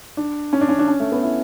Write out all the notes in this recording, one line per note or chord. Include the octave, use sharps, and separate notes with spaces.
D4
C#4
D4
C#4
D4
C#4
A3
B3
E4